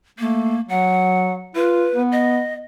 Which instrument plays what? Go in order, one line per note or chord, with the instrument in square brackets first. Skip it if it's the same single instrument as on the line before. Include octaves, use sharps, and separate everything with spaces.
[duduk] A3 [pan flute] A#3
[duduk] F#3 [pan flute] F#5
[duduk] F4 [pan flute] B4
[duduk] B3
[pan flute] D#5